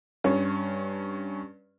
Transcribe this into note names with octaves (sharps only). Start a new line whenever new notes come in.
G2 C#4